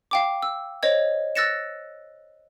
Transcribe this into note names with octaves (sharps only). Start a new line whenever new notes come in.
F5 G5 D6
E6
C5 C#5 D#5 G#6
E6 F#6 A6 A#6 C#7 E7